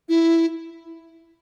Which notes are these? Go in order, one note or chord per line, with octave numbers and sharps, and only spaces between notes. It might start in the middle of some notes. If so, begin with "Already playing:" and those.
E4